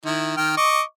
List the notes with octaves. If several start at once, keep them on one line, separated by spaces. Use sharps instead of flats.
D#3 E4
D#3 G5 F6
D#5 C#6 D6